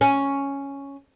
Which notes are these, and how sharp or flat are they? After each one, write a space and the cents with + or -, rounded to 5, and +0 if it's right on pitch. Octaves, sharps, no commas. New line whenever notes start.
C#4 +0